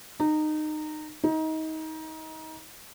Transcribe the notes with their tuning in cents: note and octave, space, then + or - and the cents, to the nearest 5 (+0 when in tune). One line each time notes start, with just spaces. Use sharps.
D#4 -20
D#4 +25